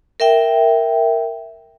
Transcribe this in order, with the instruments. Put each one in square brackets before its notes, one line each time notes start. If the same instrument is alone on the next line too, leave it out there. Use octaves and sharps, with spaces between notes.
[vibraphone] A#4 E5 G5